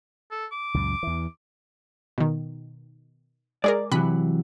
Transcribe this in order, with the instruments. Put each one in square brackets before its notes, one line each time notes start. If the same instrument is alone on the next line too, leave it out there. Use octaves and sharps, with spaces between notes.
[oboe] A4
D6
[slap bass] C#2 F#2 A#2
E2 E3
[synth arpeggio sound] B2 D#3
[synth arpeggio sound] G#3 G#4 A#4 [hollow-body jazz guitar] D5
[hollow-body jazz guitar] C3 E3 F#3 [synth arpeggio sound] B5 F#6